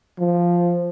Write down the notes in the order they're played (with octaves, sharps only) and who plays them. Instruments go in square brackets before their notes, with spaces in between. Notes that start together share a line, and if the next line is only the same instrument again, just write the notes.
[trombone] F3